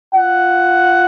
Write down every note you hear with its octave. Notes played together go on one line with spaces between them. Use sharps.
F4 F#5